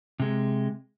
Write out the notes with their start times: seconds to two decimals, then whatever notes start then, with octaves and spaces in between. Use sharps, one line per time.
0.20 C3 G#3